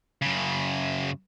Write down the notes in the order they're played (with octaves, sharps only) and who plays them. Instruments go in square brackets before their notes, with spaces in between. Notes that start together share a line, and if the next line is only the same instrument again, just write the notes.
[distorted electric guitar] F#2 C#3